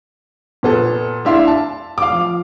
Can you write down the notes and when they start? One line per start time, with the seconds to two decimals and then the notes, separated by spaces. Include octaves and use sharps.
0.63 A#2 B3 A4
1.25 D4 E4 E5 F5 C6
1.47 A5
1.98 F5 D6
2.12 F3